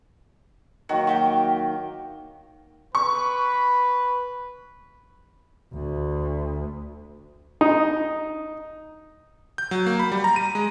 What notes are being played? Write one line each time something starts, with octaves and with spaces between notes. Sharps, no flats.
D#3 F#3 A#3 F#4
F#4 G4 G5
B4 C#6
D2
D#4
G6
F#3
A#3
B5
G3
A#5
D#7
G#3